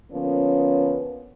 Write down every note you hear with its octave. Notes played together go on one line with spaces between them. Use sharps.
D3 F3 A#3 B3 C#4